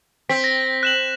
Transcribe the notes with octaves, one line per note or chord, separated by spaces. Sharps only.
C4 B6
A#6
F#6 E7 F#7